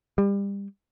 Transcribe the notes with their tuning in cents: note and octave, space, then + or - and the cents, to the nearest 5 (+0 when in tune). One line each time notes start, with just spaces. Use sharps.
G3 +30